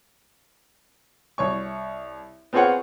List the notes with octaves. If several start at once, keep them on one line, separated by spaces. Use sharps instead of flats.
C2 C#5 C#6
B3 C4 F4 G#4 C#5 F#5